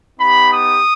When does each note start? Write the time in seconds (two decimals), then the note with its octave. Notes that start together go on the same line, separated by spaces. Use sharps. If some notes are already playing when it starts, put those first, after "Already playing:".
0.20 B3 D#4 G4 B5
0.52 D#6